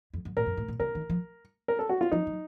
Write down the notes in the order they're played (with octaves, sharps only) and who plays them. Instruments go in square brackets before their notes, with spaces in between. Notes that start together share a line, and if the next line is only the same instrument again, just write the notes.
[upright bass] F2
F#2
[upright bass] A2 [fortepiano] A#4
[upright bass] F#2
A2
A#2
[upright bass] C3 [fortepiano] A#4
[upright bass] D#3
F3
[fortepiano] A#4
A4
F#4
F4
[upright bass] F3 [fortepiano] D#4
[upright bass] F#3